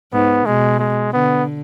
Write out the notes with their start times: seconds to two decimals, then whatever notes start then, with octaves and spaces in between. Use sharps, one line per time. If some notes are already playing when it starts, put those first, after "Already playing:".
0.12 G#2 B3
0.46 B2 G#3
0.79 G#3
1.13 D3 B3